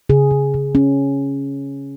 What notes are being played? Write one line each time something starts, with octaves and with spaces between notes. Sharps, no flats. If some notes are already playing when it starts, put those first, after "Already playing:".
C#3 G#4
C#3
C#3
C#4